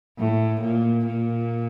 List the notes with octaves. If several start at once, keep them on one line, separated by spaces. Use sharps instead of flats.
A2
A#2
A#2